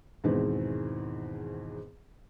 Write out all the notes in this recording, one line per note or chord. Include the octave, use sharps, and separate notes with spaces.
E2 G#2 B2 D#3 E3 C4